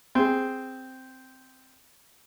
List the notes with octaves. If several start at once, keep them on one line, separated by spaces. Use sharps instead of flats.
C4 G#4